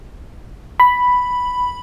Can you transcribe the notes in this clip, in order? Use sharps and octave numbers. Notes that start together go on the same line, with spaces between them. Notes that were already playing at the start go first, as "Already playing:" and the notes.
B5